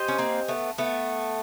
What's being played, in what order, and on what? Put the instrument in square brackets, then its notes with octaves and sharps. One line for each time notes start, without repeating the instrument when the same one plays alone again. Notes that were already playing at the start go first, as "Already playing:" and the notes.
Already playing: [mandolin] G4 C5 D#5 G#5
[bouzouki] C#4
A#3 C4
A3 B3
A3 B3